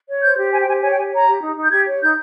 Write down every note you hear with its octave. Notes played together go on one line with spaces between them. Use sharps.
C#5
C5 G6
G4
C5 G#5
G5
G4 G#5
C#5 G#5
G5
G4 G#5
C#5 A#5
G4
D#4
D#4
G6
G4 G#6
C#5
D#4 G6